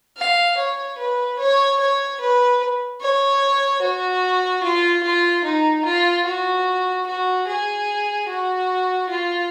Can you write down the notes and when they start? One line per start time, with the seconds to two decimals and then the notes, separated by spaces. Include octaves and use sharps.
0.17 F5
0.57 C#5
0.98 B4
1.39 C#5
1.80 C#5
2.20 B4
3.01 C#5
3.82 F#4
4.63 F4
5.03 F4
5.44 D#4
5.85 F4
6.25 F#4
7.07 F#4
7.47 G#4
8.29 F#4
9.10 F4